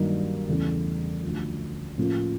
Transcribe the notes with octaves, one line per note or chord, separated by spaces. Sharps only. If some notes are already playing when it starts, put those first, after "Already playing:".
Already playing: G2 D#3 F#3 A#3 D#4
E2 C#3 E3 A3 C#4
D2 D3 F3
A2 F3 A#3 C#4 F4